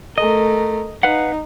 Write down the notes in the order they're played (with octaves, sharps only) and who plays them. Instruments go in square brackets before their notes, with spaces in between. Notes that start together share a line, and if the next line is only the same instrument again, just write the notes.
[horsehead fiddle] A3 A#4 [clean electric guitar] D#5
[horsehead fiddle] D#4 [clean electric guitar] B4 F5 F#5